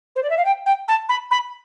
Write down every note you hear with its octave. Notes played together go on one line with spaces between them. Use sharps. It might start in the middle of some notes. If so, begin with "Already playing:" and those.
C5
D5
E5
F5
G5
G5
A5
B5
B5